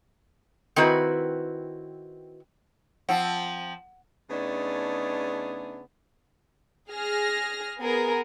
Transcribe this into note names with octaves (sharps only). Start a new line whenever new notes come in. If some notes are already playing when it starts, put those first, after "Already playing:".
D#3 C4 E4 F#4 B4
F3 C4 F#5
C#3 A3 B3 D4 D#4 G#4
G#4 F6 A#6
B3 G#4 A#4